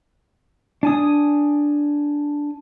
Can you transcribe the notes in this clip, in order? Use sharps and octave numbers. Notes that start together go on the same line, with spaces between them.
D4 G#5 D#6